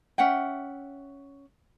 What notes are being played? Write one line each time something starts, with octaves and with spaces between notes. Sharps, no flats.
C#4 E5 F#5 G5